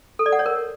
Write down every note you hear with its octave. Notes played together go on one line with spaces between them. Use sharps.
A4
D5
F#5
C#5
A#4